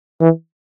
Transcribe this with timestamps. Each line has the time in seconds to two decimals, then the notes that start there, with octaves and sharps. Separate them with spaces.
0.21 E3